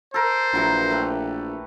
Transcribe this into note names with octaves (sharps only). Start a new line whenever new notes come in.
A4 A#4 C5
A#1 E3 F#3 A#4
A3 G4 B4